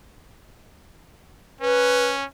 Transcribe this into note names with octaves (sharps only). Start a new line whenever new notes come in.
C#4 B4